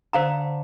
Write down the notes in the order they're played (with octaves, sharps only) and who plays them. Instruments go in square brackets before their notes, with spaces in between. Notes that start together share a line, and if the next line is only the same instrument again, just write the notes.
[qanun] D3 [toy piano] C5 F5 A#5